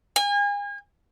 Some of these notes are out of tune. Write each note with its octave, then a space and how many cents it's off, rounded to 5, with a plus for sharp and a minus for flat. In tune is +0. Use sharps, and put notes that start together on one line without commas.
G#5 -35